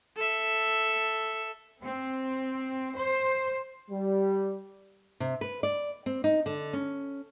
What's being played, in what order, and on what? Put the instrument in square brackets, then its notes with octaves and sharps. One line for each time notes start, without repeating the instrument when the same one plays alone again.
[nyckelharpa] A4 E5
[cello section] C4
C5
[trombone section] G3
[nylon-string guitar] C3
B4
D5
C4
D#4
D3
C#4